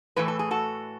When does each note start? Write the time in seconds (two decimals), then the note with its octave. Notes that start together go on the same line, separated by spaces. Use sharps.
0.16 A2 E3 A3 B4
0.28 A4
0.39 G#4
0.51 F#4 A4